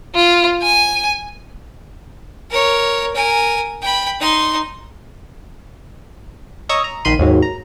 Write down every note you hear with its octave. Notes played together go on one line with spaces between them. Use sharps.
F4
G#5
A#4 C#5
A#4 G#5
G5 B5
D#4 C6
C#5 D#5 A#5 C#6 D#6 E6
A#5
A#1 D#3 B5 C6 D#7
D#2 G#2 F#3
A#5